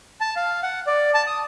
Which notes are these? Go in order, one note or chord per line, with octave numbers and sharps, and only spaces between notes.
A5
F5
F#5
D5
A5
D#6